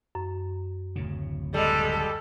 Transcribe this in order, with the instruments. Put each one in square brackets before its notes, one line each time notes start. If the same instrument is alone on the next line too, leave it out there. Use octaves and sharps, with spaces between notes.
[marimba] F#2
[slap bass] D1 A2 C#3
[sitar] G3 G#3 [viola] A4